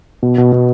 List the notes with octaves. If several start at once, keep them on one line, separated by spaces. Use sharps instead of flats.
B2
B2
B2